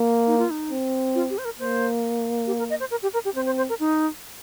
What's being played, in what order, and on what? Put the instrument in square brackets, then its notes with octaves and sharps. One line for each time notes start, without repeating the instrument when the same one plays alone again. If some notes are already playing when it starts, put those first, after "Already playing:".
Already playing: [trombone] A#3
[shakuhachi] D#4
F4
D#4
[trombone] C4
[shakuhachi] F4
G4
C5
A#4
[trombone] A#3 [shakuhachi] C5
[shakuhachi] G4
A#4
D#5
C5
A#4
G4
A#4
G4
[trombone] C4 [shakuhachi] C5
[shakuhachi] C5
C5
A#4
D#4